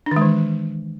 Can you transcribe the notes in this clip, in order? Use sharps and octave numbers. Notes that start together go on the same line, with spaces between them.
D4
D#3
G#3
E3